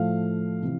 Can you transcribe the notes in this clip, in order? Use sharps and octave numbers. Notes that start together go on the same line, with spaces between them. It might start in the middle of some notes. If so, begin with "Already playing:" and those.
Already playing: A2 F3 A3 F5
C3 E3